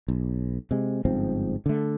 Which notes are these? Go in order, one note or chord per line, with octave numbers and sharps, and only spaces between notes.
B1
C3 G#3
G1 G#2 F3 C4
D3 A3